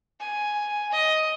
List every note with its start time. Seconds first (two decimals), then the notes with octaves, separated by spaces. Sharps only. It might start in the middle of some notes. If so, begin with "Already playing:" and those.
0.20 G#5
0.92 D#5